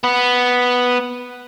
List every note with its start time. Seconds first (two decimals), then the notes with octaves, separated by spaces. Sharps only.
0.04 B3